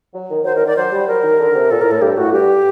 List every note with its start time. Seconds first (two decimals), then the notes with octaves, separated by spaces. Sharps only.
0.13 F#3
0.30 D#3
0.44 F#3 C5
0.55 D#3 A#4
0.65 D#3 D5
0.76 F#3 C5
0.92 G3
1.08 F#3 A#4
1.23 D#3
1.39 D3
1.55 C3
1.71 A#2 A4
1.80 A2 A#4
1.91 A2 A4
2.02 G2 G4
2.17 A2 F#4
2.33 G2 G4